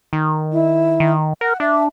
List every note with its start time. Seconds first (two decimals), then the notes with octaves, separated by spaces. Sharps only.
0.13 D#3
0.52 E4
1.00 D#3
1.41 A#4 F#5
1.60 D4 E5